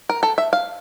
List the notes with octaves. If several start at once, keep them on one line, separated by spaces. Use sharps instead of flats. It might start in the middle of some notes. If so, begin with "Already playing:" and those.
A#4
A4
E5
F5